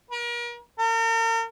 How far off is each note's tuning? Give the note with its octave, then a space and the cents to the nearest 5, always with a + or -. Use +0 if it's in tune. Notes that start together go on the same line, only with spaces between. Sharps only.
A#4 +40
A#4 -40